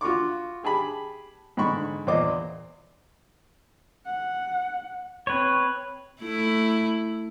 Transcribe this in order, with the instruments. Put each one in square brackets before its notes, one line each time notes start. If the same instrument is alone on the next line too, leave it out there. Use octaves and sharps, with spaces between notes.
[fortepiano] F4 F#4 C#6 D6
G4 G#4 A5 B5
G#2 D3 B5 C#6
E2 A#2 C5 D#5 D6
[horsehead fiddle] F#5
[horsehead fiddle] C4 [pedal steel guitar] B4 C#5
[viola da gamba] A3 E4